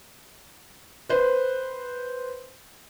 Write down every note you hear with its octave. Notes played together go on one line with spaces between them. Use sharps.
B4 C5